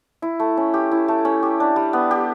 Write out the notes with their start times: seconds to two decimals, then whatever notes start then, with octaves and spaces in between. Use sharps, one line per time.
0.22 E4
0.40 A3
0.57 C#4
0.74 G4
0.91 E4
1.08 A3
1.25 C#4
1.43 G4
1.60 D4
1.76 G3
1.93 B3
2.11 G4